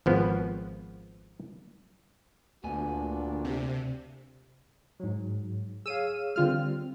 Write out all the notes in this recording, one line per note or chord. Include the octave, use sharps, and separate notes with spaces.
G#1 F3 B3
D2 A#2 A3 B3 D4 F#4 G#5
C3
G#2 F#3
G#4 C#5 F5 E6 D#7
D3 G3 C4 F4 F6